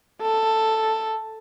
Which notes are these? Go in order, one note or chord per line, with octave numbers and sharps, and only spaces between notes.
A4